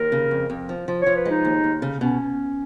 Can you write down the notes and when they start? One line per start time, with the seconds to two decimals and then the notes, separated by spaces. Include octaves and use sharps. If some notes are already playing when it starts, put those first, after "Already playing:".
Already playing: D#2 A#4
0.12 C#3
0.31 F2
0.50 F2
0.69 F3
0.88 F3
1.02 F3 C#5
1.16 B4
1.25 G#3 D#4
1.45 D#2
1.64 D#2
1.82 C#3
2.01 B2 C#4